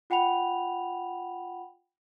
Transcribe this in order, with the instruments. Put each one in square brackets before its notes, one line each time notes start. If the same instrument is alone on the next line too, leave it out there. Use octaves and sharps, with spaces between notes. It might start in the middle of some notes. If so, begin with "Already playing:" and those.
[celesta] F4 F#5 G5 B5 F7